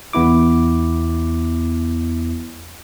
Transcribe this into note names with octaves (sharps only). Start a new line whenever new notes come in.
E2 B3 E4 D6